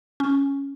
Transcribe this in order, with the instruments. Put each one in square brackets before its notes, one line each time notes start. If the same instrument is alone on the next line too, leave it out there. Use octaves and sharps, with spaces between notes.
[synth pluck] C#4